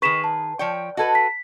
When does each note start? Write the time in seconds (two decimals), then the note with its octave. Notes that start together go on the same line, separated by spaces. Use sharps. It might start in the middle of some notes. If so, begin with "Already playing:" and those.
0.02 D#3 G#4 B4 C#6 B6 E7
0.24 A5
0.59 F3 C#5 D5 G5
0.97 F#4 A4 B4 D#5 A5 G#6
1.15 B6